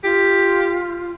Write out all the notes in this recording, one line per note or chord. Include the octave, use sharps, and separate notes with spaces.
F4 G4